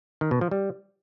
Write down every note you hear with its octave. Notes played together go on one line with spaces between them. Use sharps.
D#3
B2
F3
G3